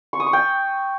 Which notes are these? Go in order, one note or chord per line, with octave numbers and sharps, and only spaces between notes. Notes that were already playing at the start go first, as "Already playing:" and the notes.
C#6
D#6
C#6
G5